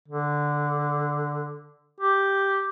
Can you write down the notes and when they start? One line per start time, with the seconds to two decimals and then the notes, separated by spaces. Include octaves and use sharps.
0.08 D3
2.00 G4